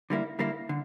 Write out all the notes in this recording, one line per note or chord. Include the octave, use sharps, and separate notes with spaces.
D3 G3 A#3 E4
D3 G3 A#3 E4
D3